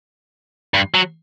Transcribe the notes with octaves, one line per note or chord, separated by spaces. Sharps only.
G2
F#3